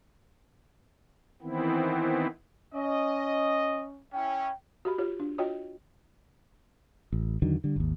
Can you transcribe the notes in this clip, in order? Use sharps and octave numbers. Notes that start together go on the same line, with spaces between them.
D#3 E3 B3 C4 E4
C#4 D#5
C#4 E4 G5
F#4 G4 B5
F4 G4 C#5
D4
F4 F#4 C#5 D#5 G5
A1
E2 D3 D#3 F#3
D3 G3
G#1 D#2